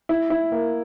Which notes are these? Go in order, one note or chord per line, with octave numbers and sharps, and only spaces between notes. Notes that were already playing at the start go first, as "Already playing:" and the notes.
E4
E4
A#3